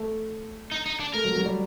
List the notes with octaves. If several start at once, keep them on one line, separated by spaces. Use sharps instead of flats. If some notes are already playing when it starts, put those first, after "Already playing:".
Already playing: A3
D#4
D#4
D4
A3 A#4
F#3
F#3
G3